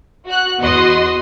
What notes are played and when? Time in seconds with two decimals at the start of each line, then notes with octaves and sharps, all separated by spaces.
0.27 F#4 F#6
0.61 E2 B3 F#4 D#5 C6